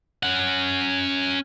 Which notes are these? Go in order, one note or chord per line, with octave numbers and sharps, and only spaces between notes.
C#4 F#5